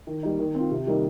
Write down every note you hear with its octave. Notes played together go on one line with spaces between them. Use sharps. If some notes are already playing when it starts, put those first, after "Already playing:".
D#3
G3 A#3 D#4
D#3
C4 F4
C3
D#3 G3 A#3 D#4